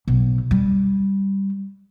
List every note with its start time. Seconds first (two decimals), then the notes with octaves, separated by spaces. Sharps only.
0.07 B1
0.51 G3